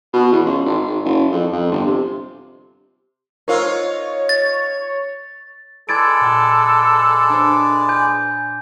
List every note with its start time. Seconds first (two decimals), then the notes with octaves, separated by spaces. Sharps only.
0.13 B2
0.32 E2
0.45 C#2
0.65 G#1
0.85 G#1
1.05 F#1
1.31 F2
1.53 F2
1.71 G1
1.86 C3
3.48 D#4 F4 A#4 C5 C#5 E6
4.29 A6
5.89 G#3 A4 B4 D5 B5 G#6 A6 D7
6.20 A#2 G5
7.30 D4 C5
7.89 G#5 G6